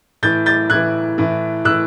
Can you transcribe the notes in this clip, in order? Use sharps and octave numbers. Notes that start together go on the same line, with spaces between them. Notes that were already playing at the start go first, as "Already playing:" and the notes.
A2 E3 G6 A6
G6 A6
A2 E3 F#6 G#6
A2 E3
A2 E3 E6 F#6